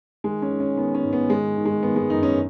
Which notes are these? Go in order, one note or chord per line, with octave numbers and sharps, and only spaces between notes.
D#3 G#3
C#4
D#3
C#4
D#3 B3
C#4
G#2
B3
D#3 G#3
D#3
G#3
D#3 B3
G#3
F#2 D#4
C#4